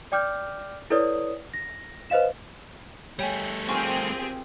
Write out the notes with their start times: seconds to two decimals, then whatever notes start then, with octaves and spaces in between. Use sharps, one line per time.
0.12 D5 G5 D6 F6 G6
0.90 E4 A4 B4 C#5 D5 D#6
1.54 A#6
2.10 B4 C5 D#5 F5 E7
3.19 G3 A3 C#5 G5 G#5
3.69 C4 F4 G4 G#4 A#4 G5 G#5 C#6